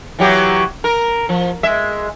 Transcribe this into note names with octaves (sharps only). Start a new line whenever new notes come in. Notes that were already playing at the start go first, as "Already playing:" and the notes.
E3 F#3 G4
A#4
F3
G#3 E5